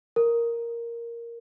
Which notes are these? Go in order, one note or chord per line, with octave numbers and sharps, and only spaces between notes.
A#4